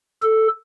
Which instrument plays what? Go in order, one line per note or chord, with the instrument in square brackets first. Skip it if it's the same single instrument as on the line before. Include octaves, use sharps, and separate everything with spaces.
[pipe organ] A4